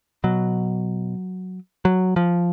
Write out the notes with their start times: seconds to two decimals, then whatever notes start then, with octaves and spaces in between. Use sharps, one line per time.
0.24 B2 F#3
1.85 F#3
2.16 F3